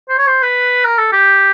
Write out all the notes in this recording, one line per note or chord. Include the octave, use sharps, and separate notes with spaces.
C5
C#5
C5
B4
A#4
A4
G4